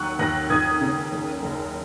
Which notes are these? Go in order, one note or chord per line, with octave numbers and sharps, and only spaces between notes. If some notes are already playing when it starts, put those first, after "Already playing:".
Already playing: D#2 F#3 C#6 F#6
D#2 F#6 A#6
D#2 D#6 G#6
C#3
F#1
F#1